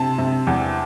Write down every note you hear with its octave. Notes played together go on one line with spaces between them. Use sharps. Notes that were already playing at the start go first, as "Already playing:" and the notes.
Already playing: C3 A5
C3
E2